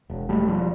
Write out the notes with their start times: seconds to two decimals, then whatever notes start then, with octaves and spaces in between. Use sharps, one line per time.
0.10 E1
0.29 E1 G3 A3
0.47 E1 F3 G3